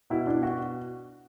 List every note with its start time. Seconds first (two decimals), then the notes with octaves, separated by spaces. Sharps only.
0.10 B2 E4
0.27 D4
0.43 F#4